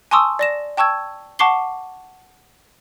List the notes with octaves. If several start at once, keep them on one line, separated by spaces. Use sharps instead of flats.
G#5 A5 C6 C#6 D#6 E6
D5 A#6 E7
G5 A5 C#6 E6 G#6
F#5 A5 C#6 D6 C7 G7